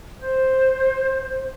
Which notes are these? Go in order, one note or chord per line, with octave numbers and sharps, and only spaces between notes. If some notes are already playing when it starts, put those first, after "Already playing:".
C5